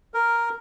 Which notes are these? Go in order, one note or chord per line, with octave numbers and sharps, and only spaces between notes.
A#4